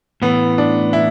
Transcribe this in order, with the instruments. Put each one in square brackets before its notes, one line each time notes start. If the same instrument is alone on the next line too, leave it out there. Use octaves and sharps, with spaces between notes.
[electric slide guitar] A2 E3 A3 [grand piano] B3
[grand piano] D4
E4